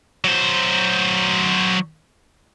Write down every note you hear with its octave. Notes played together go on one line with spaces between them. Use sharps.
F#3 C5